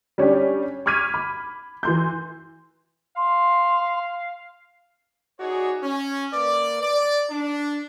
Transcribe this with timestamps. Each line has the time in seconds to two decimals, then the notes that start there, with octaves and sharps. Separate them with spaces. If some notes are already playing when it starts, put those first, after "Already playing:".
0.18 G3 C#4 D4 G4
0.86 C#6 D6 F6 G#6 B6 D#7
1.14 B5
1.83 E3 C6 G6
3.17 F5 C6
5.40 D#4 F#4 G#4 C#5 D5
5.82 C#4
6.33 A#3 B4 D5
6.81 D5
7.30 D4